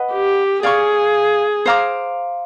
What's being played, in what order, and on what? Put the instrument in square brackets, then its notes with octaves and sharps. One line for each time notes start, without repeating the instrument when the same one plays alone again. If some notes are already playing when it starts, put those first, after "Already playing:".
Already playing: [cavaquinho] B4 D#5 F#5
[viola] G4
[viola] G#4 [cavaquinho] D5 F5 G#5 C#6
[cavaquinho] C5 F5 A#5 D6